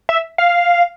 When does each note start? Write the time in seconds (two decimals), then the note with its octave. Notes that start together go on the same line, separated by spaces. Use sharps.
0.09 E5
0.38 F5